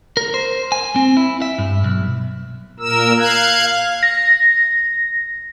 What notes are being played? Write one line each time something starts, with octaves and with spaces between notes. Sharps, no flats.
A#4
C5
G#5
C4
E4
E5
G2
B1
A#2 A#4 E6
F5 F#6 G#6
A#6